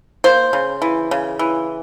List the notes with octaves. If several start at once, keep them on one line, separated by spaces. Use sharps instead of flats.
A#3 C5
C#3
E3
C#3
E3